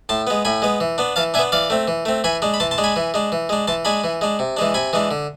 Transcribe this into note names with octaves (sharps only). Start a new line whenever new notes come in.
A2 A5 C6
G#3 B3
A2 G#5 B5
G#3 B3
E3
B3 D4
E3 F5 A5
B3 D4 E5 G#5
E3 D5 F5
A3 C4
E3
A3 C4
E3 G#5 B5
G#3 D4
B5
E3 A5 C6
A5 C6
G#3 D4
G#5 B5
E3
G#3 D4
E3
G#3 D4
E3 A5 C6
G#3 D4 G#5 B5
E3
G#3 D4
C3
E3 G#3 D4
C3 G#5 B5
E3 G#3 D4
D3